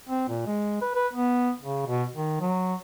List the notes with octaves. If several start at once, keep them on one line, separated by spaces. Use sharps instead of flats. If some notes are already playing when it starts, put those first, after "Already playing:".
C4
A#2
G#3
B4
B4
B3
C#3
B2
D#3
F#3